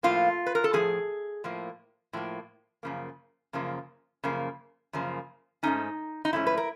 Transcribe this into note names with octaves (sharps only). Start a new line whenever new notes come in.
A2 F3 A#3 F4
B4
A#4
A4
A2 F3 A#3 G#4
A2 F3 A#3
A2 F3 A#3
F#2 C#3 F3 A#3
F#2 C#3 F3 A#3
F#2 C#3 F3 A#3
F#2 C#3 F3 A#3
G#2 F3 A3 C#4 D#4
D#4
G#2 F3 A3 C#4 E4
B4
A#4